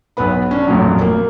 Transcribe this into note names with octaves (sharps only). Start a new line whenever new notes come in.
B1 B3 B4 B5
C#4 D4
A1 F2 A#2 F#3
A#3